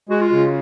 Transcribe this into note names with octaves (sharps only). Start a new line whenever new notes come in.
G#3 F#4
F4
C#3